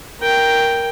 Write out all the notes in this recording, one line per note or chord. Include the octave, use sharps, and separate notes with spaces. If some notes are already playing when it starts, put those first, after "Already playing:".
A#4 G5